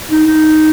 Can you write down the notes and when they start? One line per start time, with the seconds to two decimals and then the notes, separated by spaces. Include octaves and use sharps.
0.10 D#4
0.27 D#4